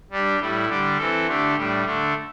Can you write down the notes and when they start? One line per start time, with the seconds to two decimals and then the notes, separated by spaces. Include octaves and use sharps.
0.11 G3 D4 G4
0.39 A2 G3 E4
0.68 D3 G3 D4 G4
0.98 E3 C4 A4
1.26 D3 A3 D4 G4
1.56 A2 G3 D4
1.85 D3 A3 D4